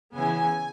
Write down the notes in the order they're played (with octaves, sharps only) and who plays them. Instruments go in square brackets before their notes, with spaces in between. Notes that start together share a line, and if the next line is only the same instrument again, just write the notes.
[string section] C#3 E3 B3 E4 G#5